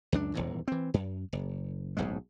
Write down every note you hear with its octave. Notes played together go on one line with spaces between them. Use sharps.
C#2 F#2 D4
D#1 G#1 E2 G#2
E3 C4
F#2
F#1
D1 B1 G#2 G#3